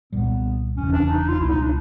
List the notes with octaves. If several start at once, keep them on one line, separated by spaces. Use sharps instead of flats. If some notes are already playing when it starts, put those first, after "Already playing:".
C2 A#2 G3 B3
F1 E2 C#3 E3 C#4
D4
D#4
F4
C#2 B2 G3 B3 E4
D#4
D4